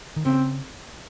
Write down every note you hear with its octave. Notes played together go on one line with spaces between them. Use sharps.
D#3
C#3 C4